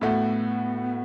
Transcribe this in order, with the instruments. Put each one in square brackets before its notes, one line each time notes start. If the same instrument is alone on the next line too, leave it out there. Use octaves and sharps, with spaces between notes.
[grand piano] A2 A3 F#4 [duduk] B3